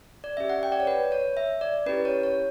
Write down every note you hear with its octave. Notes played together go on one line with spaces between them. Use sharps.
D5
C#4 G4 E5
F#5
G5
D5
C#5
B4
C#5
E5
D5
C#4 E4 G4 B4
C#5
C#5